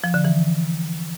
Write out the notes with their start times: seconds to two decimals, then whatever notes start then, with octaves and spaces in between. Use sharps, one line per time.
0.04 F3
0.14 D3
0.25 E3